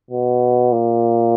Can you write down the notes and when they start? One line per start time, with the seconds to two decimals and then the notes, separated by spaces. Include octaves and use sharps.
0.11 B2
0.72 A#2